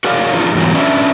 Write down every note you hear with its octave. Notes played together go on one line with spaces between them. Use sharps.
F#4 G#4 A#4 C#5 D5 F5
F3 D4 D#4 F4 G#4 B4
E2 G#2 F#3 G3
C#4 D4 B4 D#5 E5